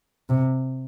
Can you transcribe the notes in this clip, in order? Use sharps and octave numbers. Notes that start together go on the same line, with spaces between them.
C3